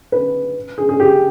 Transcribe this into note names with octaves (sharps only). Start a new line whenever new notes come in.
B4
G#4
G#4
G4